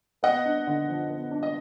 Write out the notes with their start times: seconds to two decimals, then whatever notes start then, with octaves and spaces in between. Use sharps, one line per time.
0.23 B3 D#5 F#5
0.45 D4
0.67 D3
0.89 F3
1.10 B3
1.31 D4
1.43 D#5